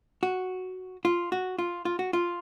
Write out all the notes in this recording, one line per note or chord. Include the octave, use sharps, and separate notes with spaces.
F#4
F4
F#4
F4
F4
F#4
F4